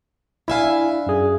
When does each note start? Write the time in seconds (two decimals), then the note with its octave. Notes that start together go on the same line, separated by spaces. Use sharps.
0.48 D4 E4 E5 F5 G#5
1.07 F#2 G#4